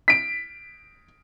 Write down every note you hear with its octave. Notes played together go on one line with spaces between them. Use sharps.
B6 D7